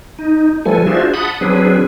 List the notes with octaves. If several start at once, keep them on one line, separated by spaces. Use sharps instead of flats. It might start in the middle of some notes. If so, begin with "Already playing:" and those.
D#4
F3 G3 A3 A4 B4 G#5
D4 F4 F#4 G#4 C5 E5
F#5 A5 B5 D#6
F#3 C4 D4 G#4 B4